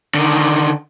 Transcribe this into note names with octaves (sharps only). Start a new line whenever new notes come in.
D3 D#3